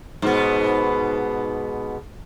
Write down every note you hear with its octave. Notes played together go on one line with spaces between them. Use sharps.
G#2 B2 B3